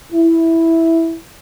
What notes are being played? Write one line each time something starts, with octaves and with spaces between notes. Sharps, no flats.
E4